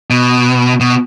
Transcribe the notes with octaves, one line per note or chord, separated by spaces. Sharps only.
B2
B2